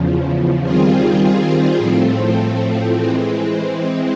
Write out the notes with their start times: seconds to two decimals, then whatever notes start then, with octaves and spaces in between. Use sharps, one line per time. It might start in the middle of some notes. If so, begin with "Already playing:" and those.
Already playing: E2 C#3 F3
0.63 D#3 G3 C4 F4 G#4
1.78 A2 F3 A3 C4
2.93 E3 G#3 C4